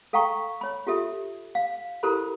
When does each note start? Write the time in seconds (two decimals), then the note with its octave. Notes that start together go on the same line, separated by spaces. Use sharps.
0.13 A4 F5 G5 A#5 C#6
0.61 C#5 B5
0.87 F4 G4 A4 E5
1.55 F5
2.03 E4 G4 A4 A#4 C5 B5